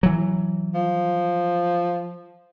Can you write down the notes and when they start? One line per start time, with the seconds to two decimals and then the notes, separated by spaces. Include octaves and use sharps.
0.03 E3 F#3
0.75 F3